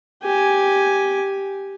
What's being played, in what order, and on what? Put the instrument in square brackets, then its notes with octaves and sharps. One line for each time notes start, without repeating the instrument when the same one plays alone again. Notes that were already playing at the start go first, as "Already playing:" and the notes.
[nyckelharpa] G4 G#5